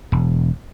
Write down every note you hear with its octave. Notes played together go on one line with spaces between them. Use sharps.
E1